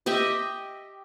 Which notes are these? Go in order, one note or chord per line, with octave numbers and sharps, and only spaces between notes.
G4 D#5 E5 G5